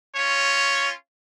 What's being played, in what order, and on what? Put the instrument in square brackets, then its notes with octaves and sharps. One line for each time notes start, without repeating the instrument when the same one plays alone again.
[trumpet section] C#4 F4 C#5